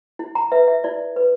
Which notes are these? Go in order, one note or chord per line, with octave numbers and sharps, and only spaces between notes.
E4
A#5
B4 E5
E5
E4 D5
B4